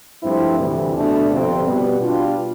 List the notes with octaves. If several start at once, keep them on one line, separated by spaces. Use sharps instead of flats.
G2 F3 A3 C4 E4
D2 C3 E3
B2 A3 D4
G1 F2 C3 F3 C4
B2 G3 B3
B2 G3 D4 F4